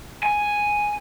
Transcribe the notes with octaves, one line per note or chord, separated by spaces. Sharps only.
G#5